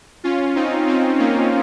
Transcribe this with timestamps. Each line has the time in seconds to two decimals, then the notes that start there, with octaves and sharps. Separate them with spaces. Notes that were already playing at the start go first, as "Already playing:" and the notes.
0.24 C#4 F4
0.56 C4 D#4
0.87 C4 D#4
1.19 A#3 C#4